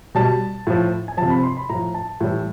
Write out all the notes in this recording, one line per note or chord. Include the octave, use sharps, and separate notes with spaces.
B2 G3 A5
A2 F3
G#5
C3 F3 A5
B5
C6
B5
A2 F3 A#5
A5
A2 E3 G3